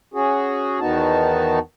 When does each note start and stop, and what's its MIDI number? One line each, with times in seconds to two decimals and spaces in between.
0.14 0.80 61
0.14 0.80 66
0.14 0.80 68
0.80 1.59 40
0.80 1.59 51
0.80 1.59 59
0.80 1.59 63
0.80 1.59 66
0.80 1.59 81